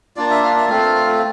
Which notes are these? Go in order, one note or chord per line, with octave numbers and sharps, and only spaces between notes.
A#3 D4 F4 D5
E5
F5
E5
A3 C4 F4 F5